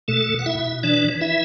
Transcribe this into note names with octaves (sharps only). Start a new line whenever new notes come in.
B2 A3 A4
B2
F#5
E4 E5
B2
E3 D4 D5
E3
E4 E5